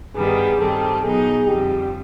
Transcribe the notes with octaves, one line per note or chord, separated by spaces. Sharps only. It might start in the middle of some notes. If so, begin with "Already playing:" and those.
G2 D#3 G3 B3 G#4
G2 D#3 G3 C4 A4
B2 F#3 B3 D#4 G#4
F2 D3 G3 G4